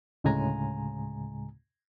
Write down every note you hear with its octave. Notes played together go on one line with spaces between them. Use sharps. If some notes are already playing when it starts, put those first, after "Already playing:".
D2 A2 C#3 G#3 G#5 A#5